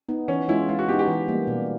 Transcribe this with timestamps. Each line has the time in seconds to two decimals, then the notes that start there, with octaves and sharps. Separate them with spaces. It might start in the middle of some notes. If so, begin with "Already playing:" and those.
0.09 B3 D#4
0.28 E3 C#4
0.48 G#3 C#4 E4 F4
0.69 G#3 F4
0.79 F#4
0.89 B3 D#4 G4
0.99 G4
1.08 E3
1.28 G3 A#3
1.47 B2